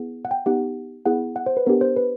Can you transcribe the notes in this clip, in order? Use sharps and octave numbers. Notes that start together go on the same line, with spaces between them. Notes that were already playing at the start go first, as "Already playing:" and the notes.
Already playing: B3 E4 G#4
F#5
G5
B3 D#4 G4 F#5
B3 E4 G#4 F#5
F#5
C5
B4
B3 D4 G4 A#4
C5
B4